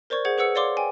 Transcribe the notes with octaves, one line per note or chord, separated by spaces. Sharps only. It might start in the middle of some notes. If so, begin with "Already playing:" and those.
A#4 C5 D5 C#6 G#6
G#4 C5 F#5 G#6
G#4 B4 F#5 E6 C#7
C#5 D5 F5 C6 D6
G5 G#5